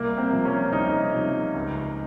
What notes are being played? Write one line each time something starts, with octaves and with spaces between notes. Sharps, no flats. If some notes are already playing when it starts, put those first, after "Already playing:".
Already playing: C2 A#3
C4
C3 F3
C#4
C2 D#4
C3 F3
C#2